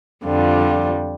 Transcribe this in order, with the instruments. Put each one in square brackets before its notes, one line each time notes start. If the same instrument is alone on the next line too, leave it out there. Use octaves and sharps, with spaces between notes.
[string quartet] F2 D3 G3 F4